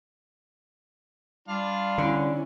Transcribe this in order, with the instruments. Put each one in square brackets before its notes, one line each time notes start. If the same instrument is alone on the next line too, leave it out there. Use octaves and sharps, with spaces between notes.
[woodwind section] G3 [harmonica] D4 F4 F5
[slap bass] D3 [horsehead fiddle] C#4 E4